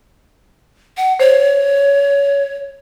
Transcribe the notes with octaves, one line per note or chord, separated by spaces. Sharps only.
F#5
C5 C#5